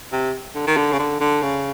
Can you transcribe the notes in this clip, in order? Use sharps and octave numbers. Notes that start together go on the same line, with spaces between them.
C3
D3
D#3
D3
C#3
D3
D3
C#3